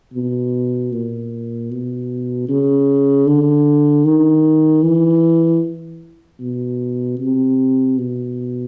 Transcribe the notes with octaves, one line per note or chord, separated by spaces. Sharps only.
B2
A#2
B2
C#3
D3
D#3
E3
B2
C3
B2